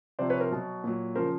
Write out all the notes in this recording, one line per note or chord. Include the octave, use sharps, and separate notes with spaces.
C3 F3 C5 D5
B4 C#5
A#4 C5
B2 F#3
A#2 F#3
C#3 F3 A#4 C5